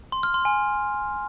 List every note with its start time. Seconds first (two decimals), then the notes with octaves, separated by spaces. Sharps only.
0.12 C6
0.23 F6
0.34 C6
0.45 G#5